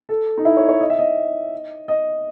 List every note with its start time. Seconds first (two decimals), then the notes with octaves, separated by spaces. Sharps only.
0.09 A4
0.38 D#4
0.45 E4
0.57 C#5
0.69 C#5
0.81 D#5
0.90 E5
0.99 D#5
1.88 D#5